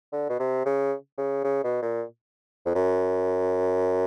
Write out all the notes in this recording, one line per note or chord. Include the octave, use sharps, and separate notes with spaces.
D3
B2
C3
C#3
C#3
C#3
B2
A#2
F2
F#2